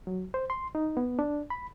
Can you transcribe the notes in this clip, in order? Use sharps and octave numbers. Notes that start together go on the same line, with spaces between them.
F#3
C5
C6
D#4
B3
D4
B5